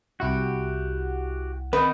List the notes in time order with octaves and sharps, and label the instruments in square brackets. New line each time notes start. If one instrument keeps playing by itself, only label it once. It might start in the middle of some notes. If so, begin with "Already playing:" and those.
[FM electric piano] C2 E4 F#5 [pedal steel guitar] F#4 G4
[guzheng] D#3 [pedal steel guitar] B3 C4 [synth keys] B4